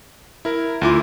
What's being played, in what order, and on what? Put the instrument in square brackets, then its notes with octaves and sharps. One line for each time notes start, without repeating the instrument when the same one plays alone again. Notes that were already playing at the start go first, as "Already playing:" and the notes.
[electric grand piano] E4 A#4
[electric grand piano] D2 E4 D6 [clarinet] F4